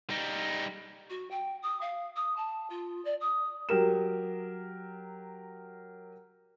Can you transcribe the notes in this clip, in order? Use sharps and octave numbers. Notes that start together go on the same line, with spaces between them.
G3 D#4
F#4
G5
D#6
F5
D#6
A5
F4
D5
D#6
F#3 G4 A#4 E7